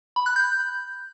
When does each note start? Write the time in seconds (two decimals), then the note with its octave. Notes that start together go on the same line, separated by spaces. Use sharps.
0.16 B5
0.26 F#6
0.36 G6